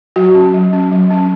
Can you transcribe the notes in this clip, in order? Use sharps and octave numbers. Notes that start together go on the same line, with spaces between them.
F#3 F#4
C#4
F#3
C#4
F#3
C#4